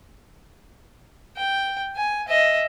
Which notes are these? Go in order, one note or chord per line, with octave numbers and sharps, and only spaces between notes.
G5
G#5
D#5 E5